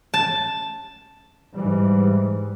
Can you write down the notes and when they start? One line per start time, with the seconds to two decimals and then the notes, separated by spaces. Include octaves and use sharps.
0.14 A5
1.54 G#2 E3 G3